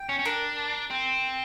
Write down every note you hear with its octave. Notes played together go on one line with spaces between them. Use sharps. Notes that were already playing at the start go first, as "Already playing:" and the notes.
Already playing: G5
C#4
C#4
D4 A#4 A#5
C4